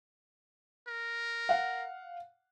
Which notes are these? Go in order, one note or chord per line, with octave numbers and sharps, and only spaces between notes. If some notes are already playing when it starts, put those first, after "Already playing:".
A#4
F5 F#5